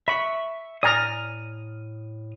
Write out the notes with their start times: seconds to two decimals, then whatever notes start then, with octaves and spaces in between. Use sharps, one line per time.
0.08 E5 B5 C#6
0.83 A2 D5 G#5 A#5 D#6 F6